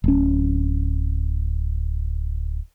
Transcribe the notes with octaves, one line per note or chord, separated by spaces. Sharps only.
D1 C#4